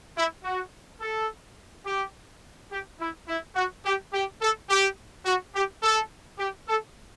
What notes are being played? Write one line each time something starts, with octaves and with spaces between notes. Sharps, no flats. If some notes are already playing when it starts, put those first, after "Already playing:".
E4
F#4
A4
G4
G4
E4
E4
F#4
G4
G4
A4
G4
F#4
G4
A4
G4
A4